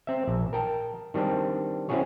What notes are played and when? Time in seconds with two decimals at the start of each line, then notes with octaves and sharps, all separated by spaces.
0.07 C4 E5
0.28 A#1
0.53 A#4 G5 A5
1.14 D#3 G3 C4 D4
1.89 C4 C#4 E4 F#4 G#4 C#5